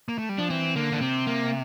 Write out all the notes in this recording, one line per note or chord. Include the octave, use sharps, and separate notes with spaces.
A#3
A3
G3
F3 D4
E3 C4
D3 A#3
D3 D4
C3 C4
A#3